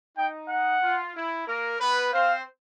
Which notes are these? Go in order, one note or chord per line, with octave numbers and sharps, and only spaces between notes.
D#4 G5
F#5
F4
E4
A#3 A#4
B3 B4
C4 C5 F5